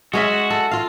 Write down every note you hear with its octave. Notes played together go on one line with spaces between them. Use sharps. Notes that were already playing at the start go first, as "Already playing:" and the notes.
G#3 C#4 F#4 E5
A4
F4 F5